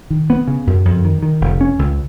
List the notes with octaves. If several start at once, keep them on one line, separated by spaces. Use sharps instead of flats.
D#3
B3
C#3
F#2
F2
D#3
D#3
F1
C#4
C#2